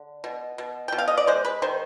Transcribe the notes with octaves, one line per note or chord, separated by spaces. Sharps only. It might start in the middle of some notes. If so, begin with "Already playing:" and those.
Already playing: D3
B2
B2
B2 G5
F5
D#5
D5
G#3 C5
B4
D#3 C5